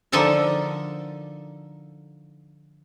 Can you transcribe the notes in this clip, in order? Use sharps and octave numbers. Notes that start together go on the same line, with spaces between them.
D3 F3 D#4 A4 A#4 E5